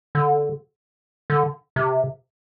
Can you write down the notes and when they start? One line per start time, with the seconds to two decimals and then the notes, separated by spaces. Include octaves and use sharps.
0.15 D3
1.30 D3
1.76 C3